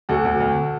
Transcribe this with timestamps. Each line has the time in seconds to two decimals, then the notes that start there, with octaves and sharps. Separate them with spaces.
0.09 D2 F#4 A4
0.25 D2
0.40 D2